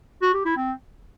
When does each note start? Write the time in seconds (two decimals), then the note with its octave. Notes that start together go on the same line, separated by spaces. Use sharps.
0.22 F#4
0.34 G4
0.45 E4
0.57 C4